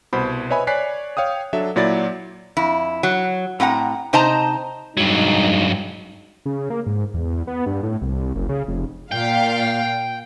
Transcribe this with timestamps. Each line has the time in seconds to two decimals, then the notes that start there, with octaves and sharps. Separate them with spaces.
0.13 C2 B2 C5 B5
0.50 B4 C#5 D#5 E5 G#5 B5
0.67 C#5 D5 G#5 F#6 B6 C7
1.17 C#5 F5 G5 D#6
1.53 F#3 D4 A4 E5
1.76 A#2 F#3 E4 D5 A6
2.57 F2 E4
3.03 F#3
3.60 A2 C4 F#5 A#5
4.13 C3 D#4 C5 D#5 A5 A#5
4.97 G2 F#3 G#3 D#4
6.46 C#3
6.70 A#3
6.86 G#2
7.14 E2
7.47 B3
7.66 G2
7.83 A2
8.02 C2
8.35 F#1
8.49 C#3
8.68 F1
9.12 A#2 F5 G5